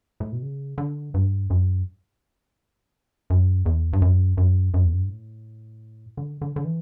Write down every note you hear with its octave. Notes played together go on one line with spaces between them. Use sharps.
A2
B2
C#3
D3
G2
F#2
F#2
E2
G2
F#2
F#2
F#2
E2
F#2
G2
A2
D3
D3
D3
E3